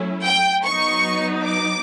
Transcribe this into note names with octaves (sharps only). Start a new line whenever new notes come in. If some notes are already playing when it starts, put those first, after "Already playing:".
Already playing: F#3 A3 C#4 E4
G5
F#3 B3 D#4 C#6
D6